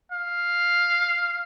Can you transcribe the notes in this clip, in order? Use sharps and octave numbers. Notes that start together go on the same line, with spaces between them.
F5